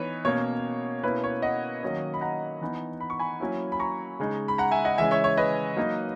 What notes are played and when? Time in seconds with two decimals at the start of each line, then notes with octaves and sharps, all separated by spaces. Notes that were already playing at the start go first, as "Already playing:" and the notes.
Already playing: E3 B3 D#4 B4 C#5
0.25 B2 A#3 C#4 C#5
1.03 B2 A#3 C#4 E4 B4
1.24 C#5
1.42 D#5 F#5
1.83 D#3 F#3 A#3 C#4
2.14 B5
2.21 F#5 A#5
2.61 E3 B3 D#4
3.00 B5
3.10 C#6
3.19 G#5 B5
3.40 F#3 A#3 C#4 E4
3.72 B5
3.80 A#5 C#6
4.20 C#3 G#3 D#4
4.48 B5
4.58 F#5 A#5
4.71 E5 G#5
4.85 D#5 F#5
4.98 C#3 E3 G#3 C#4 E5 G#5
5.11 C#5 E5
5.24 C#5
5.37 B4 D#5
5.77 F#3 A#3 D#4